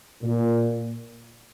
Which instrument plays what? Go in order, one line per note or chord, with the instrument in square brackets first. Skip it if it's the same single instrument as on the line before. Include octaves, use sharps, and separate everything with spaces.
[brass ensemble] A#2